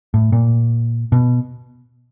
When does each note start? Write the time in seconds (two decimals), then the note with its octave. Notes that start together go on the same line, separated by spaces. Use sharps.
0.14 A2
0.32 A#2
1.12 B2